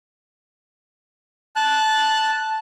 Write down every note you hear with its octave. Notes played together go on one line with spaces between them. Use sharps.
A5 F#6